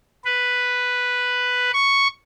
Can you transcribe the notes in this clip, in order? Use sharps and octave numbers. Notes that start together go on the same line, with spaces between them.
B4
C#6